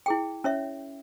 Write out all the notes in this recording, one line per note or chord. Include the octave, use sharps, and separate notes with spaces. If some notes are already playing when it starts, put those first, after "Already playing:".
E4 G#4 G5
C#4 C#5 E5